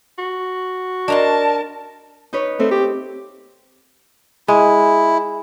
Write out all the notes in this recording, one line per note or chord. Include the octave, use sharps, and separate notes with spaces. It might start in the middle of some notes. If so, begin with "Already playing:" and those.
F#4
D4 A#4 D5 D#5 A5 A#5 C6
D#4 B4 C#5
A3 C4
G4
G#3 E4